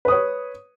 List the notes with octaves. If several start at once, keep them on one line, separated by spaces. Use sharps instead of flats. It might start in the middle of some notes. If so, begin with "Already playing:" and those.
B4 C#5 D#6